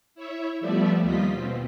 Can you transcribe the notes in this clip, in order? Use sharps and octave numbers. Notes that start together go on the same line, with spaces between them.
E4 C#5 E5
F3 G3 A3 B3 D5 E5
D#2 G3 F4 D#5 B6
B2 C4